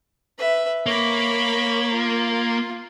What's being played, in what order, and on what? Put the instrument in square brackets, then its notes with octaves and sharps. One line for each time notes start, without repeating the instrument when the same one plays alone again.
[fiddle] B4 E5
[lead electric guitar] A#3 [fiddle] C#5 B5
[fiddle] F4